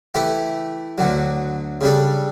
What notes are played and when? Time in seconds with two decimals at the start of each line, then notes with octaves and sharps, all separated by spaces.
0.14 E3 A3 E4 G4
0.98 D2 D3 F#3
1.81 C#3 G3 D4 A4